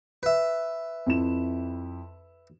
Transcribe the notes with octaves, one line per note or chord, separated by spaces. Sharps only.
B4 E5
F2 E4 E7